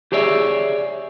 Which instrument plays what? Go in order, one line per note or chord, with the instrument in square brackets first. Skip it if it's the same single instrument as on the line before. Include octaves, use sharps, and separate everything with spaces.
[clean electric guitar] G4 G#4 C#5 D5 E5